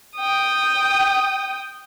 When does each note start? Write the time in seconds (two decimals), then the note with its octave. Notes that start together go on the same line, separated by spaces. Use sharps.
0.16 G5 D#6